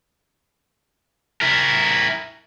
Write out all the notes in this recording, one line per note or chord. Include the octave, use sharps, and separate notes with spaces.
E4 A#4